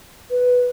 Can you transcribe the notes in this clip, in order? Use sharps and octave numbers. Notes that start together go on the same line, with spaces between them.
B4